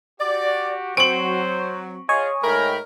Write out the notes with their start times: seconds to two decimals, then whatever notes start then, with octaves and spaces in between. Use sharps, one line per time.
0.20 F#4 G4 D5
0.97 F#3 C4 C5 C#6 D7 F#7
2.09 F4 G#4 C#5 D#5 G#5
2.43 G#2 A3 A#4 G5 B5